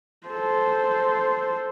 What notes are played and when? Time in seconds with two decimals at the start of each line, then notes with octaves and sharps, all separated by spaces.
0.27 A4 C5